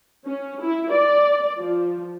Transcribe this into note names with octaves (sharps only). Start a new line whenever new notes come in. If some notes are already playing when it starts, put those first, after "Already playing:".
C#4
E4
D5
F3